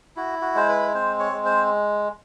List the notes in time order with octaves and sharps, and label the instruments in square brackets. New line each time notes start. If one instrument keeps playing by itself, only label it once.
[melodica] E4 F#4
F#4
G#3 C5
B4
C4 C5
C#5
G#3
C5